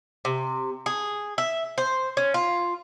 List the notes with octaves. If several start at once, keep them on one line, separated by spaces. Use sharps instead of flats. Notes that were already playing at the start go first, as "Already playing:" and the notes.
C3
G#4
E5
C5
C#4
F4